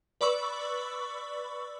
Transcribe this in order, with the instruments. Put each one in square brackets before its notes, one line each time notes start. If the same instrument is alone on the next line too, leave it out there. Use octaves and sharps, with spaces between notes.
[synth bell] B4 D5 B5 C#6 E6